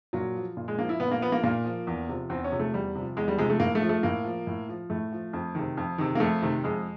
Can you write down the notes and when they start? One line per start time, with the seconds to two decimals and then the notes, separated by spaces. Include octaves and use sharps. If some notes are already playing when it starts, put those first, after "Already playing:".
0.13 A#2 F#3
0.35 F3
0.57 A#2
0.68 G#3
0.79 F3 A#3
0.89 E4
1.00 A#2 B3
1.11 A#3
1.21 F3 B3
1.32 A#3
1.44 A#2 A#3
1.65 F3
1.87 E2
2.09 C3 F3
2.30 E2 C4
2.44 C#4
2.52 C3 F3
2.59 A3
2.73 E2 G3
2.95 C3 F3
3.17 E2 G#3
3.28 G3
3.38 C3 F3 G#3
3.50 A3
3.60 A2 A#3
3.75 A3
3.82 F3
3.89 A3
4.03 A2 A#3
4.25 F3
4.47 A2
4.69 F3
4.90 A2 A3
5.12 F3
5.33 F2
5.55 C3 D#3
5.77 F2
5.98 C3 D#3
6.15 A#3
6.20 F2 A3
6.42 C3 D#3
6.64 F2 G#3